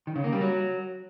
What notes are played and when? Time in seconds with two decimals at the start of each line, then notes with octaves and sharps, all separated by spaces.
0.07 D#3
0.16 C#3
0.24 A#3
0.33 G3
0.41 F#3